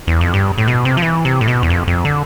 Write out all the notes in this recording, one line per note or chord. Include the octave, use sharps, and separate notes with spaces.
E2
F2
G2
A2
B2
C3
F3
E3
C3
A2
B2
E2
F2
F2
D3